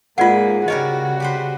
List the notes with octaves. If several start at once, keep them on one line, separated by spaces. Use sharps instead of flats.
G#2 G#3 A#3 F4 B4 D5 F#5
C#3 G3 F#4 A#4 C#5 D#5
G4 B4 C5